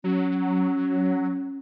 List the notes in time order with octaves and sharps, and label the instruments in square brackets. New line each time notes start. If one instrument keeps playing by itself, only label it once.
[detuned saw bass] F#3 [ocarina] C#4